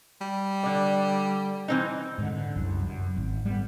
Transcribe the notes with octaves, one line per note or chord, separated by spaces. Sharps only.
G3
D3 D5
E3 C4 D#4
G#2 D3
D3
F#1 C2 F#2
F#2
G#1
G3 A3 B3